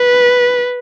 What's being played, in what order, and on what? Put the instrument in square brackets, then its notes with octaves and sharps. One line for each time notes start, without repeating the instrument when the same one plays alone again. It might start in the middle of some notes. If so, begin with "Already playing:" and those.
Already playing: [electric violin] B4